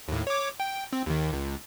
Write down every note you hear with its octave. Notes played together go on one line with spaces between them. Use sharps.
D#2 A2
C#5 D6
G5
C4
D#2 D#3
C#2